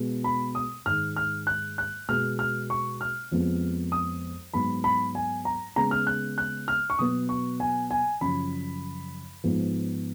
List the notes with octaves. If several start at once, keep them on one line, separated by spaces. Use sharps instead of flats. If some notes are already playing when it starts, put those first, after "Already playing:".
Already playing: B2 G#3 B3
B5
D#6
G#2 D#3 G#3 F6
F6
F#6
F#6
B2 G#3 B3 F6
F6
C#6
F6
F2 F3 G#3 B3
D#6
G#2 F#3 B3 B5
B5
G#5
A#5
C#3 G#3 B3 A#5
F6
F#6
F#6
F6
C#6
B2 F#3 B3 D#6
C#6
G#5
G#5
F#2 C#3 F3 B5
G#2 F3 B3